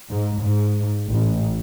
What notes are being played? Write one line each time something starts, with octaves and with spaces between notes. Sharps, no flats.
G#2
G#2
A1